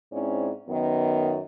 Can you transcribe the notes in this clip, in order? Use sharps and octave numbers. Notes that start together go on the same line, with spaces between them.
G#2 C4 C#4 E4 D5
F#2 D#3 B3